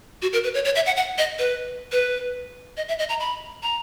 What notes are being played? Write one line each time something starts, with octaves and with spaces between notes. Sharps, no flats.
F#4
A#4
B4
C#5
C#5
E5
F#5
F#5
D#5
B4
B4
D#5
E5
D#5
A#5
B5
A#5